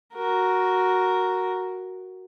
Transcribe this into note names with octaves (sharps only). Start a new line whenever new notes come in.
F#4 A#4